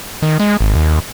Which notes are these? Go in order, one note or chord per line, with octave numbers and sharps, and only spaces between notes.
D#3
G#3
G#1
D#2